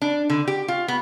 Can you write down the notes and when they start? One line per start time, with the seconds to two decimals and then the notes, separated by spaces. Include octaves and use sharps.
0.02 D4
0.30 D3
0.47 G4
0.68 F4
0.88 B3